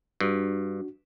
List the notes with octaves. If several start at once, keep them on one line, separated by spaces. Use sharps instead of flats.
G2 D4 F#4